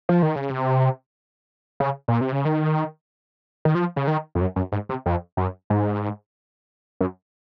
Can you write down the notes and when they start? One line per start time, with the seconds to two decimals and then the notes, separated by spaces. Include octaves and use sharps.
0.09 F3
0.23 D#3
0.36 C#3
0.50 C3
1.80 C#3
2.08 A#2
2.21 C3
2.32 C#3
2.45 D#3
3.65 D#3
3.75 F3
3.96 C#3
4.07 D#3
4.35 F2
4.41 F#2
4.56 F#2
4.72 G#2
4.89 C3
5.06 F2
5.37 F#2
5.70 G#2
7.01 F#2